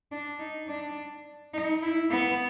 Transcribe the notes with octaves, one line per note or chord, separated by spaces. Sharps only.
D4
D#4
D4
D#4
E4
B3